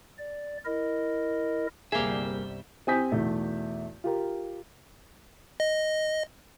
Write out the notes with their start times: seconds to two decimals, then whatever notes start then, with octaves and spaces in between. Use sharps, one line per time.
0.19 D5
0.65 E4 A#4 D#5
1.92 G1 C2 G3 A#3 G4 G#4 C5 E5
2.87 C4 G4 G#5 D#6 G6 B6
3.12 B1 E2 A3
4.04 F4 G4 A#4
5.60 D#5